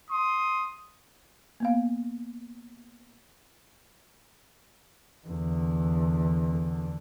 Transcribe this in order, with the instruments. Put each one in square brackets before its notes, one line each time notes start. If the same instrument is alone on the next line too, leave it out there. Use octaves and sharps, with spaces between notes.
[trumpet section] C6 D#6
[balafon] A#3 B3 F5
[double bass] E2 D3